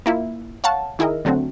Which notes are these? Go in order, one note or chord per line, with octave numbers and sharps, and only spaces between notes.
A#3 E4 F4
C#5 F5 F#5 A5
D#3 E4 G#4 A#4 D#5
D3 F#3 A3 C4 F#4